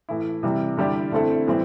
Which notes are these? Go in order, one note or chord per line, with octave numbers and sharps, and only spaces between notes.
A2 E3 A3 E4
C3 E3 G3
D3 G3 E4 G4 D5
D3 A3 C4 E4 A4
A2 E3 G3 C4 E4